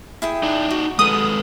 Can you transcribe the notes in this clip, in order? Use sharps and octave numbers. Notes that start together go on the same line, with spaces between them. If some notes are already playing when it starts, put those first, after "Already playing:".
E4 G#4 G5
D#4 D5
F#4
G#3 A4 B4 D#6